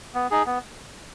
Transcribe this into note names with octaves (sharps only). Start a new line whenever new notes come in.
B3
D#4 G#4
B3